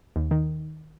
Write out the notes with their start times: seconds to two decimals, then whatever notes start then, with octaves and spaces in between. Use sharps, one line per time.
0.16 D#2
0.31 D#3